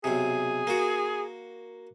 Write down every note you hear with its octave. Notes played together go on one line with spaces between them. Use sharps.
B1 C3 G#4
A#3 F#4